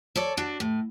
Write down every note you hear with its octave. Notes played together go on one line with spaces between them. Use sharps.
A4 C#5 D5
D4 F#4
A2